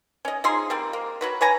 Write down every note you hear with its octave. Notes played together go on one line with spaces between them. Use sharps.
C#4 D#5
F3 D#4 G#4 C6
G3 A#3 C4
A#3
F#3 F#4 B4
B4 C#5 G#5 A#5